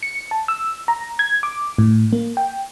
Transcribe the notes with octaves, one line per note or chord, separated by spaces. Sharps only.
C#7
A5
E6
A#5
G#6
D6
A2
A#3
G5